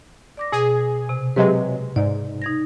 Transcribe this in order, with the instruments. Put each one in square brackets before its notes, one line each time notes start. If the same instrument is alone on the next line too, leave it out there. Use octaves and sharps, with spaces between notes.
[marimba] D5 D6 A#6
[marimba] B2 [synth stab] G#4
[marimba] C3
[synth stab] C3 F#3 G#3 [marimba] B4
[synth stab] G#2 [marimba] D5
[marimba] D#4 G#6 A#6